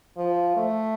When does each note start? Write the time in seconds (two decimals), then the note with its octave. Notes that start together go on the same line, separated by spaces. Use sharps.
0.17 F3
0.57 A3